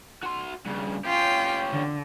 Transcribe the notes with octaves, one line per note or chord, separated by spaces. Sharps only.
F#4 C6
G2 C#3
C#4 F4 G4 G5
D3